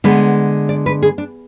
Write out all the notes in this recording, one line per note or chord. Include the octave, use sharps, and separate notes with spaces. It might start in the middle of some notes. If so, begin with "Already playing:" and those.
D3 G#3 B3 B4
D5
B4
G#4
D4